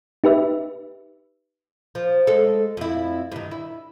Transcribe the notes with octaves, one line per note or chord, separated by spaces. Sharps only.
D#4 G4 B4 E5
F3
G#3 A4
F2 E4
G2 D#3
E4